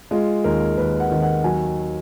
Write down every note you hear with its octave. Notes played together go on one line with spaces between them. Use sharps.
G#3 F4
D#2 A#4
D#2 B4
F#5
D#3
F#5
F#3 G#5